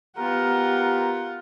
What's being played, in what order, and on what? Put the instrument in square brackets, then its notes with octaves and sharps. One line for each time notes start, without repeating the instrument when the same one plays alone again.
[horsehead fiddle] B3 G4 [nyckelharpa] F4 F#5 [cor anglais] A#4